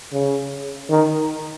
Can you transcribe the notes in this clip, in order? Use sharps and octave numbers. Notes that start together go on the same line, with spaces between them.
C#3
D#3